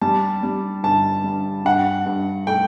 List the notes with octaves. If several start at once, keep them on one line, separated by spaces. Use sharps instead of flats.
G3 A5
G3
G1 A5
G2
G2 F#5
G2
A3 G5